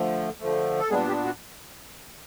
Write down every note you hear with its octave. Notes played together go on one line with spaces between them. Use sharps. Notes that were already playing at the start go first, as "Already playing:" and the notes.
Already playing: D3 F3 A3
D3 F3 A3
A4
A#2 G3 G#3 B3 D4 G#4
G3 G4
F#4